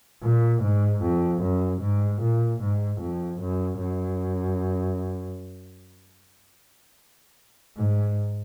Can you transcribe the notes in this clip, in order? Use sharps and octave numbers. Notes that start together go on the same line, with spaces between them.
A#2
G#2
F2
F#2
G#2
A#2
G#2
F2
F#2
F#2
G#2